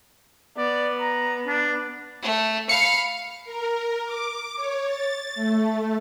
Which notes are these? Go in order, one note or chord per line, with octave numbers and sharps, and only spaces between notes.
B3 D5
A#5
D4
A3
F5 B5 C#7
A#4
D6
C#5
A6
A3